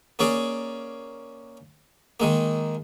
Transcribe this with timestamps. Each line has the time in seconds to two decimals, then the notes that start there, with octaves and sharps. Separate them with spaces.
0.19 A#3 C#4 G#4 D5
2.20 D#3 G#3 A#3